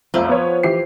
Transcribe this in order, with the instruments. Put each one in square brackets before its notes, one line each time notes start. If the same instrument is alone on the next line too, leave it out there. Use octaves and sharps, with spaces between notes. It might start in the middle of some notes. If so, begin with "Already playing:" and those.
[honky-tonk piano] B1 F2 A3 [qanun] F3
[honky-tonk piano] B3 C#5
E3 G4 C7